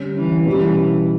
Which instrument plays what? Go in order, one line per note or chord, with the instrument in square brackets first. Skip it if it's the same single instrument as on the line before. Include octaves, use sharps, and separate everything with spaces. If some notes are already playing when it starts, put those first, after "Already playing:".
Already playing: [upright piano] D3 G3 C#4
[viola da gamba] E3
[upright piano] B2 G3 C#4 [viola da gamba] E3